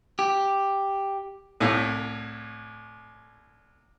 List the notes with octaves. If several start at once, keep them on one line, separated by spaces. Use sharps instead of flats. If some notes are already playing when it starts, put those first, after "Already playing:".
G4
C2 A2